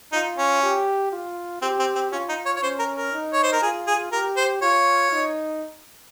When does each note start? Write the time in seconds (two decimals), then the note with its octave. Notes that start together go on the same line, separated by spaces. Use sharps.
0.12 D#4 F4
0.38 C#4
0.63 G4
1.12 F4
1.62 C4 G4
1.79 C4
1.95 C4
2.12 C#4 F4
2.29 D#4
2.45 C#5
2.56 C#5
2.62 C#4 C5
2.79 A#4
2.96 A#4
3.13 D#4
3.33 C#5
3.43 C5
3.52 A#4
3.62 F4 G#4
3.87 G#4
4.12 G4 A#4
4.37 C5
4.62 F4 C#5
5.12 D#4